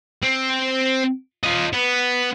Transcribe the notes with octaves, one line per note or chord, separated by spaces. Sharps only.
C4
F4 D#5
B3